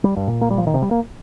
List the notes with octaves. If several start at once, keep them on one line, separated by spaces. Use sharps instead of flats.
G3
G2
A#2
A#3
G3
F3
D#3
C3
G3
A#3